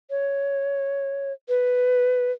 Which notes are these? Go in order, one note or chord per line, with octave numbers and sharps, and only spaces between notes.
C#5
B4